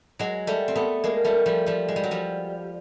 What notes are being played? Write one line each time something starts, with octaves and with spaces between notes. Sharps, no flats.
F#3 G#3
G3 A3
C4
A3 B3
G#3 A#3
G3 A3
F3 G3
F3 G3
G#3
G3
F#3
F3 G3